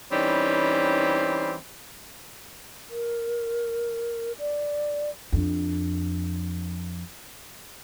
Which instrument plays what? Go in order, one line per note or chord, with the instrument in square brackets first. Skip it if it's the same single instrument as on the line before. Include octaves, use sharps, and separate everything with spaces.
[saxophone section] E3 G3 C4 C#4 D#4
[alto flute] A#4
D5
[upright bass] F2 D4